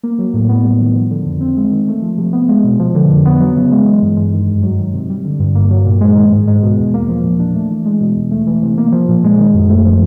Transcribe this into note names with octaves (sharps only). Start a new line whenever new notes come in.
A#3
F#3
A2
B3
G3
D#3
F3
D3
F2
C4
G#3
D#3
A3
F3
C3
B3
G#3
B2
F3
D3
F2
B3
F#3
C#3
G#3
E3
G2
G#3
D#3
F#2
F#3
D#3
C3
G3
D3
G2
A#3
F#3
A#2
G#3
D#3
G#2
G#3
B2
E2
A#3
F3
A#2
D4
A3
E3
G#3
B2
E2
A3
E3
C3
A#3
F3
A#2
G#3
D#3
F#2
A3
F3